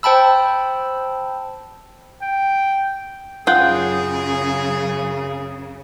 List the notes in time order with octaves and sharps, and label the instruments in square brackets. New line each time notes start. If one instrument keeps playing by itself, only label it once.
[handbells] C5 G5 A5 B5 E6
[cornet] G5
[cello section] F#2 C#3 [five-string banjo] F4 F#5 G5 [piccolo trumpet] G#4